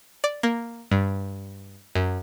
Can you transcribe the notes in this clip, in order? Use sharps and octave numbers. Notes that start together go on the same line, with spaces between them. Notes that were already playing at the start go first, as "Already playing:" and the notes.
D5
A#3
G2
F#2